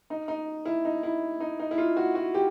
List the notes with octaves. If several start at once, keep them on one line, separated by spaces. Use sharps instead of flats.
D#4
D#4
E4
D#4
E4
D#4
D#4
E4
F4
F#4
F#4
G4